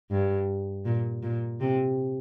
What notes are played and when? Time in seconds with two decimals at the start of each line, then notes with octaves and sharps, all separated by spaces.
0.11 G2
0.85 A#2
1.23 A#2
1.60 C3